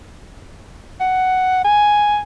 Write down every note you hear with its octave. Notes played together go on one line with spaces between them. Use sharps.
F#5
G#5